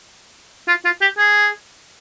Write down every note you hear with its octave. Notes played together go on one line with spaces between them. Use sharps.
F4
F4
G4
G#4